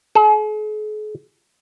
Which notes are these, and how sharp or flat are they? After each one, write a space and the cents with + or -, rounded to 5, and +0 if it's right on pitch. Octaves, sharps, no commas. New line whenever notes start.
G#4 +45